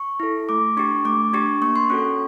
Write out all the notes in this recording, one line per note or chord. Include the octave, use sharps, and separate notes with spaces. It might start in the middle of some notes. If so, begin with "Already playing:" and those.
Already playing: C#6
E4 A4
A3 D6
D4 G4 C#6
A3 D6
D4 G4 C#6
A#3 C#6
C6
C#4 F#4 A4 C#6